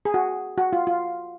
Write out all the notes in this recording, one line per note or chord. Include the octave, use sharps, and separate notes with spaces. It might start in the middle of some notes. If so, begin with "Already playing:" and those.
G#4
F#4
F#4
F4
F4